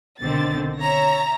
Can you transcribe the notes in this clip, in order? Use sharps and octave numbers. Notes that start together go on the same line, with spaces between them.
B1 D3 D#3 C4 A6
C#5 E5 A#5 A#6